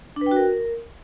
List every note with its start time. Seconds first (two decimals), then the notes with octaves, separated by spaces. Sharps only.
0.16 D4
0.21 B4
0.26 G5
0.31 F#4
0.36 A#4